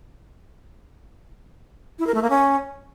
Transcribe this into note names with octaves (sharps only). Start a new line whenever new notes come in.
E4
A#4
A3
A#3
C#4